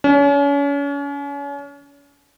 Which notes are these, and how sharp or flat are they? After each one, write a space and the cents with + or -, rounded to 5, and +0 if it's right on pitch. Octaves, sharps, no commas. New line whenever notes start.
C#4 +35